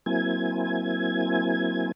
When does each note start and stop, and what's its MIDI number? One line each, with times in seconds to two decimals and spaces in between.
0.06 1.92 54
0.06 1.92 58
0.06 1.92 60
0.06 1.92 64
0.06 1.92 80
0.06 1.92 92